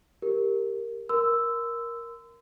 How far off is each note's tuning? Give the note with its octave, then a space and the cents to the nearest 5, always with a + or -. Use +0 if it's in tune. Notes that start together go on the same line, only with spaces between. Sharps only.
G4 +10 A#4 -5
A#4 +10 C6 -35 E6 +0